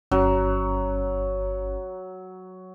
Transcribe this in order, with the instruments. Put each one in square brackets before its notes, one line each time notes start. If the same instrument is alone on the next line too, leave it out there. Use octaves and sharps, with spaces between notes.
[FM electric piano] G1 C#4 [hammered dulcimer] F#3